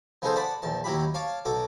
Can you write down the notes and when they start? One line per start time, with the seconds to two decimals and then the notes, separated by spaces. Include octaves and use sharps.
0.22 F3 B3 D#4 G#4 A4 C5
0.36 D5 F#5 A5 B5
0.62 A#1 E2 A5
0.84 D#2 F#3 E4 G4 B5
1.14 C#5 F5 A5 D6
1.45 B1 F#4 A4 D6